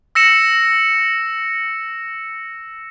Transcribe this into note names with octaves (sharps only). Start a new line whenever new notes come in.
E6 A#6 C#7 E7